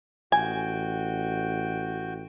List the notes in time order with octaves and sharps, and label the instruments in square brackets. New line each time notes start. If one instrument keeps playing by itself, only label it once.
[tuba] A1 [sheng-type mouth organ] F#4 G5 [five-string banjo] G#5